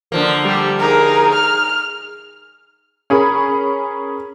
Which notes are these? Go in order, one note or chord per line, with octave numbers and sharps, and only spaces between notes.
D3 F3 A#3
G3 G4
D#4 G#4 A#4
F6
C#4 G#4 A#4 B5